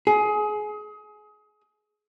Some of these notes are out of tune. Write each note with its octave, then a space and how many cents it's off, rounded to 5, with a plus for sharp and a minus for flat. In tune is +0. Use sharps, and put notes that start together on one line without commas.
G#4 +25